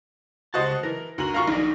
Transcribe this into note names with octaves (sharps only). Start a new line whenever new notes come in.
C#2 F#4 G4 C5 D#5 A5
E3 A#4
D2 F#4 A#5 F#7
F4 A#4 F5 A#5 C#6
A#1 D#4 A#4 D5